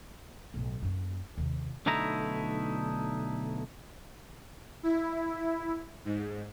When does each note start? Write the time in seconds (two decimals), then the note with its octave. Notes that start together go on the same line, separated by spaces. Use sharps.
0.54 B1 A2
0.82 F#2 A#3
1.37 D#2 C3
1.86 B1 D3 A3 D#4 E4 A#5
4.83 E4
6.05 G#2